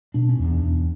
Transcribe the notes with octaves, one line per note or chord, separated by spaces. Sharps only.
B2 D4
C#4
E2 D4
E2